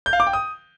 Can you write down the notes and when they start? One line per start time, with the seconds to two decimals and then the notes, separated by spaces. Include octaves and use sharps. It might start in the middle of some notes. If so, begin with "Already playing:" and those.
0.06 G6
0.13 F5
0.20 D6
0.27 G5
0.33 D#6